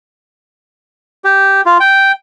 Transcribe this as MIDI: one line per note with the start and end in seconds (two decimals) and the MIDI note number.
1.24 1.61 67
1.66 1.78 65
1.80 2.12 79